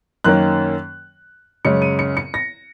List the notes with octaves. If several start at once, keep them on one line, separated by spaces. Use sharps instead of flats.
F#2 D#3 A#3 C#4 F#6
F#2 C#3 G#3 C#4 C#7
D#7
C#7
C#7
A#6